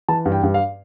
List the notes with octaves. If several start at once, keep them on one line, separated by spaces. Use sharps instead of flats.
E3 A5
G2
G5
G2
F5